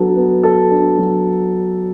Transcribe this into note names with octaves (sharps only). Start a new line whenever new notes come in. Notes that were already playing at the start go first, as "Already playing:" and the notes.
Already playing: F#3 B3 D4 A4
B3
A4
D4
F#3